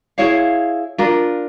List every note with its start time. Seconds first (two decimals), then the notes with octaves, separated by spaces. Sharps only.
0.18 E4 G#4 C#5 F5
0.98 D4 F4 A#4